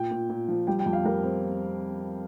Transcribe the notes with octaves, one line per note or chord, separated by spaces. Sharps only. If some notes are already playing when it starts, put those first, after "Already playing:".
Already playing: A#2 G5
A#2
A#2
F3
G3 G5
G5
F2
F5
G3 A#4
C4